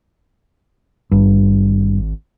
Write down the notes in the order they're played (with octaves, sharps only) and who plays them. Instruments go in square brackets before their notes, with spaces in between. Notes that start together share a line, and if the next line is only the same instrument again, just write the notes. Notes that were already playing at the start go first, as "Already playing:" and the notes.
[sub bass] G#1 [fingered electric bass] G2